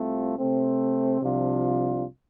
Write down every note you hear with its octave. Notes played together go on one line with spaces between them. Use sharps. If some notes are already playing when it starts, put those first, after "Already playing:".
Already playing: C2 C3 A3 C4 F4
C3 A3 C4
C2 C3 F3 D4 F4